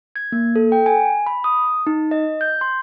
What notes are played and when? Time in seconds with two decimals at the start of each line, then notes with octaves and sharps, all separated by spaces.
0.16 G#6
0.32 A#3
0.56 A4
0.72 G5
0.86 G#5
1.27 B5
1.44 D#6
1.87 D#4
2.11 D#5
2.41 G6
2.61 C6